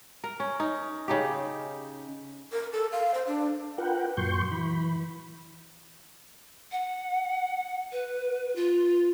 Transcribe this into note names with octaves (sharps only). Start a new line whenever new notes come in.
A#4
C#4
D#4
C#3 D#4 G4
A#4
A4
F5
C5
D4
F4 A#4 B4 F#5 G5
F#2 A#2 F#3 C6 C#6 G6
E3 B5
F#5
B4
F4